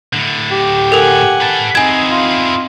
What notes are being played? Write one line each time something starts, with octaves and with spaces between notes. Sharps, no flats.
A2 D3
G4
A4 A#4 F#5 G#5
B4 A5
C4 D#4 E4 G#4 G#5 G#6
F4